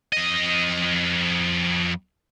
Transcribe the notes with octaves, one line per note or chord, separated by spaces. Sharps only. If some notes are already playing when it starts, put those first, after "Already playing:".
F2 D#5